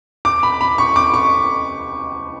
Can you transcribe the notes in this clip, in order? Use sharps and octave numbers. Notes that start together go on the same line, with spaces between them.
D6
B5
B5
C#6
D6
C#6